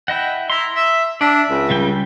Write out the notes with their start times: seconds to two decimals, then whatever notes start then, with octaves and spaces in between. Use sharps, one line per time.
0.08 E4 D#5 F#5 G5
0.50 E4 A#5 C6
0.76 E5
1.21 D4 D5 E5
1.50 C#2
1.70 C#3 G3 G5